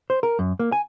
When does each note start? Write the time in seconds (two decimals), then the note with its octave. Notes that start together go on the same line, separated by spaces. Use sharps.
0.10 C5
0.23 A#4
0.39 F#2
0.59 A#3
0.72 G#5